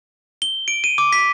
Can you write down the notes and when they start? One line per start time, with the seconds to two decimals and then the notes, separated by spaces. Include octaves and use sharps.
0.42 G7
0.68 D7
0.84 D#7
0.98 D6
1.13 B6